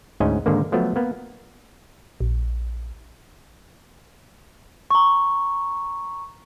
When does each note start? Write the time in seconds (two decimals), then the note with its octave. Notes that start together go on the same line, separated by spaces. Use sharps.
0.20 D2 G#2 C#4 D#5 G#5
0.46 G#2 D3 D#3 A#3
0.72 F3 F#3 A3 B3
0.96 A#3 B3
2.20 A#1
4.91 A#5 C#6